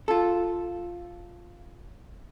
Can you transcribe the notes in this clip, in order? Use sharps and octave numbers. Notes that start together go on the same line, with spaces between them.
F4 A4